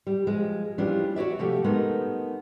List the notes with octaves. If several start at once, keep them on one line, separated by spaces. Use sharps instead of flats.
G3
F3 G#3
E3 F3 G3 C#4 D4 F4
F#4 C#5 D5 E5
C3 F3 A3 F#4 G4
G#3 A3 B3 D#4 A#4